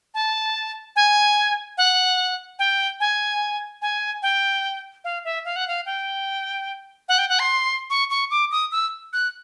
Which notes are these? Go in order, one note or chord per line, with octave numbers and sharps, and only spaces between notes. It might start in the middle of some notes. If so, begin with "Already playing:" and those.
A5
G#5
F#5
G5
G#5
G#5
G5
F5
E5
F5
F#5
F5
G5
F#5
G5
F#5
C6
C#6
C#6
D6
D#6
E6
F#6